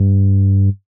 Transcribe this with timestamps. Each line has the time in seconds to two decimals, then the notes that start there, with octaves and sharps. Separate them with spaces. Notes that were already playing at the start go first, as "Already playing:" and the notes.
Already playing: G2